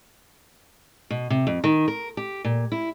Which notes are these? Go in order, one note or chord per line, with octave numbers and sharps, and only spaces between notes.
B2
C3
F2
D#3
A#4
G4
A#2
E4